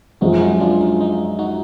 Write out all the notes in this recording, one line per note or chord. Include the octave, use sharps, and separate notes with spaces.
F#2 F3 G#3 D#4 F#4
D#4 F#4
D4 F4
D#4
D#4
D#4 F#4